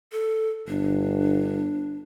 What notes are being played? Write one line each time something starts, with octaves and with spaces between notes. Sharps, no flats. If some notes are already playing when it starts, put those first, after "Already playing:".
A4
G1 D4